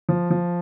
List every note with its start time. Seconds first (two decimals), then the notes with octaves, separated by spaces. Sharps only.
0.09 F3
0.31 F3